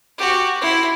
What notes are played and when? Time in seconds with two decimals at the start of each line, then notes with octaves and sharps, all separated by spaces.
0.18 F#4 G4
0.61 E4 C6